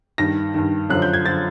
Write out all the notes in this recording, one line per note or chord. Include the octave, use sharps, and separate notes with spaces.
G2 D#3 A#6
G2 D#3
F#2 D3 F3 F#6
G6
G#6
D3 F3 A6